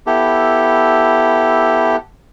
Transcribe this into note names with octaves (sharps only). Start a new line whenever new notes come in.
B3 E4 G4 A4